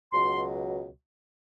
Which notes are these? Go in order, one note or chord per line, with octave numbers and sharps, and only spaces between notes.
C#2 B2 F#3 C6